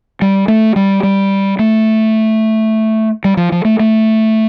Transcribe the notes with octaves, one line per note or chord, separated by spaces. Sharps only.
G3
A3
G3
G3
A3
G3
F3
F3
A3
A3